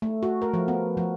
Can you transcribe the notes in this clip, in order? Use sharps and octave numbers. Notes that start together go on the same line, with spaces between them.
A3
F#4
A#4
F3
B3
F3